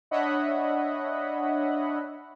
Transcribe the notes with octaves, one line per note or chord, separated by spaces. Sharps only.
D4 C#5 D#5 E5 F#5 B5